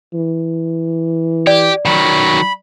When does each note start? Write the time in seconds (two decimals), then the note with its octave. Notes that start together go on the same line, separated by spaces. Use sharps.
0.13 E3
1.47 G4 D5
1.85 D#3 F#3 B5